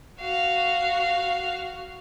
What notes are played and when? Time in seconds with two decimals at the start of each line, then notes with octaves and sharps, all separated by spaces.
0.20 F#4 F5